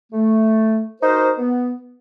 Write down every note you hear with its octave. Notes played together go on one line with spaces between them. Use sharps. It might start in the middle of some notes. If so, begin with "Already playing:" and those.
A3
D#4 F#4 A#4 C5
B3